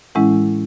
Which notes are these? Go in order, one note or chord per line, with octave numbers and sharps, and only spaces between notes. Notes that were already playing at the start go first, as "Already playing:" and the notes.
A2 E3 G#3 C#4 E4 F#5